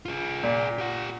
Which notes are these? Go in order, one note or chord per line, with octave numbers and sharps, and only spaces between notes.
F4 G#4
A#2
G4 F#5